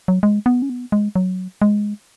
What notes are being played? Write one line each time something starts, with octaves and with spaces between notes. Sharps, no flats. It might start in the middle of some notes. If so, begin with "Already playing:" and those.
F#3
G#3
B3
C#4
B3
G#3
F#3
G#3